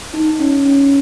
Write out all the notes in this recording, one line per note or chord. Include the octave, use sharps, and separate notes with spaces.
D#4
C#4
C#4